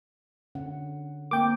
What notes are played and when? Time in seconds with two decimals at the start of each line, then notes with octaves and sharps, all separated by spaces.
0.55 D3 C#4 F#5
1.31 A#3 C4 A#4 G5 D6